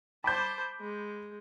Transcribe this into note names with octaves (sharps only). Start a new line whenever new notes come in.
C5 A5 B5 D6 G6
G#3